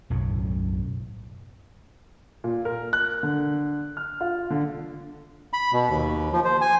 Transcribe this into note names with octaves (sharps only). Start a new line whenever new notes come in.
B1 F#2 A2 F#3
A#2
A#4
F#6
D3
F6
F4
D3
B5
B2
D#2
F3
C5
G#5